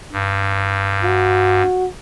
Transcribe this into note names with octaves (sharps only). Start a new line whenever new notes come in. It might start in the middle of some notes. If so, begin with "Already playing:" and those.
G2
F#4